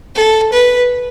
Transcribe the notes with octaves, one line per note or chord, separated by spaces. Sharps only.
A4
B4